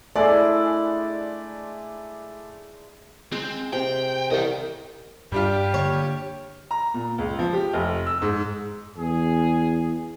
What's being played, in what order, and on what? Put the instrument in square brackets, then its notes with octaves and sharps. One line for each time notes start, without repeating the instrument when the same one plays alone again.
[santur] G#3 C6 [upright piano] A3 [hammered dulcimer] D4 E4 [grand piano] D5
[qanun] G#3 [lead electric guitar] C4
[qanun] C3 [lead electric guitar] G5
[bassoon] C2 [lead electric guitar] D#5 G5
[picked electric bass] G2 [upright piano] G3 D4 F4 [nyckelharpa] G4
[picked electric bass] D3 A#3 [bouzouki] C#5
[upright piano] A#5
A#2
C#2
F3
G4
F1
E6
G#2
[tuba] E2 [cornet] G#4